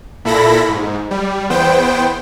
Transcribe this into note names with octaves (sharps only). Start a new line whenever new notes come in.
A#2 E4 A4 B5 A#6
G#2
G3
E2 B3 C5 G5